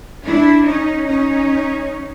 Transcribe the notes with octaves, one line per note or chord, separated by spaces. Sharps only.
D4 E4
C#4 D#4
C#4 D#4